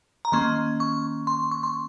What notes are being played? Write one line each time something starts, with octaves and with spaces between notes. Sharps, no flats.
A#5
D#3 A#3 C#4 C6
C#6
C6
C#6
C6